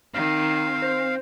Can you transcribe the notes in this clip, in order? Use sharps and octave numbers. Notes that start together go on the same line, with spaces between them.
D#3 C4 F5
C5